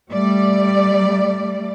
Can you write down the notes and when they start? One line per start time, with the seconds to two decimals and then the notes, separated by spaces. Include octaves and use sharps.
0.11 G3 A3 D5